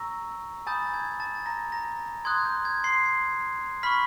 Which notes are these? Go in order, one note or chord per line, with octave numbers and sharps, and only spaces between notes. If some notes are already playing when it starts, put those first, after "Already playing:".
Already playing: A#5 C#6 E6 A#6
G#5 A5 B5 D#6 G6 A6
G#6
A5 A6
A#5 A#6
A#5 A#6
C6 D#6 F#6 G#6
G6
G#6
C6 C7
B5 C#6 F6 B6